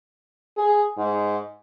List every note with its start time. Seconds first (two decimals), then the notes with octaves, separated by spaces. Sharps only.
0.57 G#4
0.97 G#2